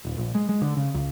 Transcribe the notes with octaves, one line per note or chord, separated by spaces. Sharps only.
D#1
A#1
G#3
G#3
D3
C#3
C#2